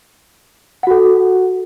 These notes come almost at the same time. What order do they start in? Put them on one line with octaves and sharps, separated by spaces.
F#5 F#4 A4